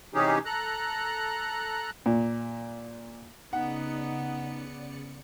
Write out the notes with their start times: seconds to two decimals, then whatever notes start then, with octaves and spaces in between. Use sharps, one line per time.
0.14 C3 E3 C#4 D#4 G4 G#4
0.45 A4 A#5 F#6
2.06 A#2
3.53 C#3 B3 D#4 D5 F#5 C#7